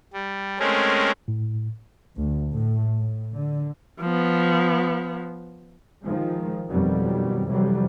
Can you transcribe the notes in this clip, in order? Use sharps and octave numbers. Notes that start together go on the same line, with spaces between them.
G3
G#3 A3 C4 C#4 A#4
A2
D2
A2
A2
D3
F3 B3
D#3 F3 G#3
F2 B2 D#3 F#3 G3
F2 C3 E3 F#3 G3